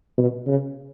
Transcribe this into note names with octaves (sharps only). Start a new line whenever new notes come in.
B2
C#3